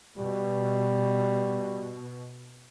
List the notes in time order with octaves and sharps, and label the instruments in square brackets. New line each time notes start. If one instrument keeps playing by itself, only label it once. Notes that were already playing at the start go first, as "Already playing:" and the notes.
[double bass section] B2 [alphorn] G3